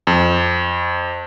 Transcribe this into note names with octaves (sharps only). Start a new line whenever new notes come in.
F2